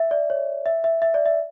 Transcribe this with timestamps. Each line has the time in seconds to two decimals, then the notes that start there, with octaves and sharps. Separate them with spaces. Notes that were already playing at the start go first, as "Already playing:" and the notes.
Already playing: E5
0.11 D5
0.30 C#5
0.66 E5
0.84 E5
1.02 E5
1.14 D5
1.26 E5